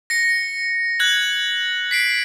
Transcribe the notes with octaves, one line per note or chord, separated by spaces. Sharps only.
A#6 C#7
F#6 G#6 F#7
B6 C7 D7